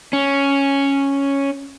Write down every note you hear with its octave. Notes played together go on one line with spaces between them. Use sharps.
C#4